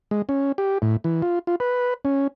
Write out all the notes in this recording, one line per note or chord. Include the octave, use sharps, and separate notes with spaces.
G#3
C#4
G4
A2
E3
F4
F4
B4
C#4